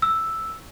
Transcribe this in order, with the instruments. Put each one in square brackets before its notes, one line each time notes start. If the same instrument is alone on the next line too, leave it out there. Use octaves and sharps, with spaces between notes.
[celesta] E6